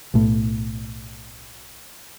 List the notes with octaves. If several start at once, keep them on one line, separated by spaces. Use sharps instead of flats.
B1 A2